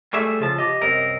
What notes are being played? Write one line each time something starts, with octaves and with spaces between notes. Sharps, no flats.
G3 A3 G#4 E5
C#3 F3 A5
G4 D#5
C2 F#2 C4 A#4 D#5